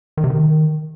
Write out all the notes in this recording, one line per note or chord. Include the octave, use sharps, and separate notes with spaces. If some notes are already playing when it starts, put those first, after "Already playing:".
D#3
C3
D#3